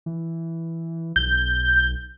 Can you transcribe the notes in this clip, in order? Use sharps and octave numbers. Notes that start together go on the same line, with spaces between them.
E3
B1 G6